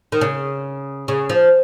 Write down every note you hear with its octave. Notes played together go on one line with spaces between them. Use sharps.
D#3
C#3
C#3
F3